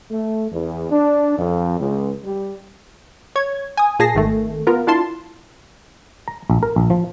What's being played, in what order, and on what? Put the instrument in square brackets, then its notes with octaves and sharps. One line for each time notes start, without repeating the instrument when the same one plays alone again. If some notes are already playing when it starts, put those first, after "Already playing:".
[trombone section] A3
E2
D4
F2
C#2
G3
[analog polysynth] C#5 G#6
G#5 D#6
A#2 G#4 A5 A#6 C7
G#1 D#3 A3
B3 F4 A#4
D4 E4 F4 A5 C6
[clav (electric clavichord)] A#5
A#1
A#4
A#1
F3